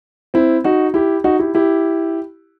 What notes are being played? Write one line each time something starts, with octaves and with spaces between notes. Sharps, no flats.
C4 E4
D#4 F#4
E4 G4
D#4 F#4
E4 G4
E4 G4